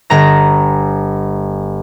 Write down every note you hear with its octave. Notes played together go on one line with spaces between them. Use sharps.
G1 A#5 A#6